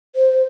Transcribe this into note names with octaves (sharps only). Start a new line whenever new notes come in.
C5